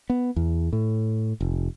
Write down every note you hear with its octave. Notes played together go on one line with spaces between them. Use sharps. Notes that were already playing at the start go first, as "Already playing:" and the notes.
B3
E2
A2
F1